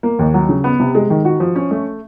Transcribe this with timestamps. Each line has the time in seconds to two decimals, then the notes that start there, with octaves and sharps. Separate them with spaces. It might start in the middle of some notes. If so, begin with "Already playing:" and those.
0.03 A#3
0.19 D#2
0.34 F#3
0.49 C#3
0.64 B3
0.80 C3
0.95 G#3
1.10 D#3
1.25 F#4
1.40 F3
1.56 C#4
1.71 A3